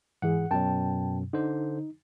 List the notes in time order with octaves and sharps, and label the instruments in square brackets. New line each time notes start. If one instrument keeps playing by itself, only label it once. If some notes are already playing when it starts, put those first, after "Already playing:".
[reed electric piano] G#2 E3 G#4 [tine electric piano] F#5
[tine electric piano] F#2 B2 F#3 [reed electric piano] G5 A5
[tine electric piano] D3 C5 [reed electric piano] D#4